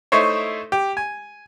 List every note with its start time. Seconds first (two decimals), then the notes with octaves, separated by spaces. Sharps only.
0.12 A3 D#4 E4 C5 C#5
0.72 G4
0.97 G#5